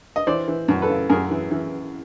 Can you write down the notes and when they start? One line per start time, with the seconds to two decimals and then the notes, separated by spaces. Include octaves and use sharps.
0.16 D#5
0.27 E3 C5 D5
0.48 E3
0.68 F#2
0.82 A4 B4
0.89 C#3
1.09 F#2 G#4 A#4
1.30 E3
1.51 E3